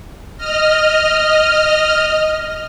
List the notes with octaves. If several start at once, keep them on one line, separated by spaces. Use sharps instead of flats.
D#5 F6